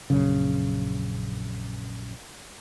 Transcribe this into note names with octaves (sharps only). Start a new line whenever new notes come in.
A#1 F#2 C#3